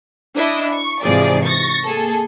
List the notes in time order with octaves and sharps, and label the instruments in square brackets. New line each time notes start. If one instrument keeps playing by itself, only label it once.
[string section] D4 E4 D#5
C#6
G#2 C3 E3 F3 G#4 D5
C#6 A6 A#6
A#3 G#4 A4